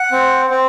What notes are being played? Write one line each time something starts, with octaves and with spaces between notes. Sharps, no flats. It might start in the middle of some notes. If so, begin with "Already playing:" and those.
Already playing: F#5
C4
C4